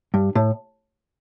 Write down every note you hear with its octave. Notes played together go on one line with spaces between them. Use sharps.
G2
A2